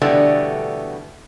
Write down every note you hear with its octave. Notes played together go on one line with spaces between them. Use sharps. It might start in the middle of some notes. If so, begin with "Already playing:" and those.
B2 D3 E3 G3 A3 B3